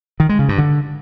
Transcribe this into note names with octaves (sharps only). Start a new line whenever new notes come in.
D#3
G#3
C#3
G2
D3